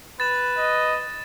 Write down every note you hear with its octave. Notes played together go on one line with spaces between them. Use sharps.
B4 A6 E7
D#5